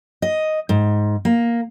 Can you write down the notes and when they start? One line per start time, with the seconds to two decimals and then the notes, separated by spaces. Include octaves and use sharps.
0.22 D#5
0.69 G#2
1.25 A#3